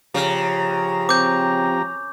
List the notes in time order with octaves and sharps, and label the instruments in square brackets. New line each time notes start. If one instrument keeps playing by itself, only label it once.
[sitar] C#3 [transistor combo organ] F3 G4 A#5
[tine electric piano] C4 [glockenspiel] D6 G6